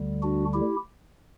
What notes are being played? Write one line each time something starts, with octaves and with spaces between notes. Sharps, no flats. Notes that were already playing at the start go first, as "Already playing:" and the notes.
Already playing: D2 D3 G3
D4 F#4
E4 G4